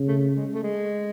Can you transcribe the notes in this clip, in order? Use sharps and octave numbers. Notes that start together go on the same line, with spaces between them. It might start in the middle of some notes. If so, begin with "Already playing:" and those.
Already playing: C#3
A3
G#3
A3
G#3